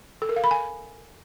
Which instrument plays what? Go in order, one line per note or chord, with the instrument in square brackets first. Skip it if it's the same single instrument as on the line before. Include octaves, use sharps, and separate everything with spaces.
[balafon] A4
A#4
F5
B5
G#5